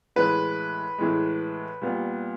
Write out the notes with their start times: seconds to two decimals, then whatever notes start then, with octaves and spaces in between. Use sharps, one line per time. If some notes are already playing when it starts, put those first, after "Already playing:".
0.16 A2 E3 G#3 B4
0.98 A2 E3 G#3
1.81 A#2 G3 B3